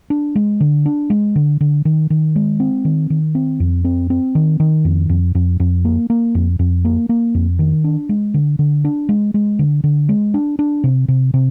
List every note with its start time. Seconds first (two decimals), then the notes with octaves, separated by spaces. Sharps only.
0.10 D4
0.35 G#3
0.60 D3
0.86 D4
1.10 G#3
1.36 D3
1.61 D3
1.85 D#3
2.10 D#3
2.36 G#3
2.60 C4
2.85 D#3
3.10 D#3
3.35 C4
3.60 F2
3.84 C4
4.10 C4
4.35 D#3
4.60 D#3
4.85 F2
5.09 F2
5.35 F2
5.60 F2
5.85 A#3
6.10 A#3
6.35 F2
6.59 F2
6.85 A#3
7.09 A#3
7.35 F2
7.59 D#3
7.84 D4
8.09 G#3
8.34 D3
8.59 D3
8.85 D4
9.09 G#3
9.34 G#3
9.59 D3
9.84 D3
10.09 G#3
10.34 D4
10.59 D4
10.84 C3
11.08 C3
11.34 C3